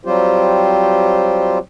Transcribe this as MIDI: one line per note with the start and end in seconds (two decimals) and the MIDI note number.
0.05 1.58 54
0.05 1.58 55
0.05 1.58 60
0.05 1.58 65
0.05 1.58 67
0.05 1.58 72